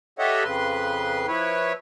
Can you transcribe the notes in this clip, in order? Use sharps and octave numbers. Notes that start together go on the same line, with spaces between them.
G4 A4 C#5 D#5 E5 F#5
F2 C#3 B4 C6
F3 E4 B4 C#5